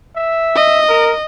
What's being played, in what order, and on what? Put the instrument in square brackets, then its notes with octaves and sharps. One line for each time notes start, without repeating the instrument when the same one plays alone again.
[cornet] E5
[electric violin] D#5
[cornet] A#4